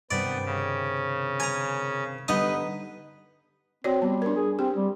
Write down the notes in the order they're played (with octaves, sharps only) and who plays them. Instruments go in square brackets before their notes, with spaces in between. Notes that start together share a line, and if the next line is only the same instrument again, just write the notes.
[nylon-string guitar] G2 C3 D#3 [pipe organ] B3 [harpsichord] D5
[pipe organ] C#3
[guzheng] A#4 [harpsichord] G#5 A#5
[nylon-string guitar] D3 G3 D4 [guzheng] B3 D#4 [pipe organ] B4 [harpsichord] D#5
[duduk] C4 [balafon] F#4 C#5 D5
[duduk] G3 [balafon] B3
[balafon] D4 A#4
[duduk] G#4
[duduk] C4 [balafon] G4
[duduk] G3